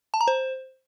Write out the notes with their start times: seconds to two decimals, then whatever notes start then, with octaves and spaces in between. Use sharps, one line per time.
0.14 A5
0.21 A#5
0.28 C5